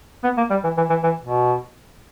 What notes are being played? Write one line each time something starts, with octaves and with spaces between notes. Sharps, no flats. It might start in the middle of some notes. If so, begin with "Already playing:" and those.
B3
A#3
G3
E3
E3
E3
E3
B2